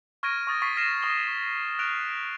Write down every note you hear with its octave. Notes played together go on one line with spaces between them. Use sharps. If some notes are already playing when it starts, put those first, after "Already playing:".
C#6 F6 G#6 A#6 D7 D#7
C#6 D#6 A6
C#6 A6 B6 C7 D#7
F6 A6 A#6 C7 D#7 E7
C#6 D#6 G7
F6 F#6 D7 F7